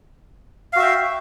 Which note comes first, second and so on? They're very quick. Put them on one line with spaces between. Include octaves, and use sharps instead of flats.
F5 F#4 E5 G5